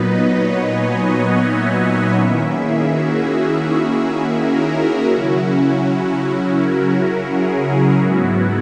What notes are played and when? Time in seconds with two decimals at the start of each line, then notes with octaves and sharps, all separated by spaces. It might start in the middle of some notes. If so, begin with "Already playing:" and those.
Already playing: A#2 F#3 B3 D#4 B4 D#5
0.30 C#5
0.67 G#5
1.04 F#5
1.39 E5
1.77 F#5
2.13 D#3 A#3 C#4 E4 E5
2.50 G#4
2.86 F#4
4.33 A#4
5.05 C#3 F#3 C#4 E4 F#4
5.79 F#4
6.52 A#4
7.25 G#4
7.99 G#2 F#3 B3 E4 F#4